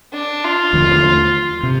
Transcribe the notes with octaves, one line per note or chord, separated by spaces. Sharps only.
D4
F4
D#2 D3 F3 A3
C3